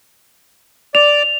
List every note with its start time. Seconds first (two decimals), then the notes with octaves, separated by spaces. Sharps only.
0.95 D5 F7